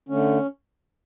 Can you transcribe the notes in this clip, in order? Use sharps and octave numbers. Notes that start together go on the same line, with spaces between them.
D3 A3 C#4